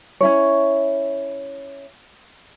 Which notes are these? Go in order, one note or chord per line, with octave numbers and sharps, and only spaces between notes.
C#4 E4 C#5